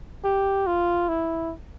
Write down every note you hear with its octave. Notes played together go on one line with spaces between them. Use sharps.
G4
F4
E4